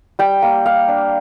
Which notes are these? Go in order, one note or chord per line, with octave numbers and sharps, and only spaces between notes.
G3 G5
A#3
G3 F5
D4